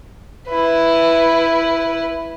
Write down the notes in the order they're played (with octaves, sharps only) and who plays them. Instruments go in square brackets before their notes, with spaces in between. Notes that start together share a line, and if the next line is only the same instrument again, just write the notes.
[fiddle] E4 B4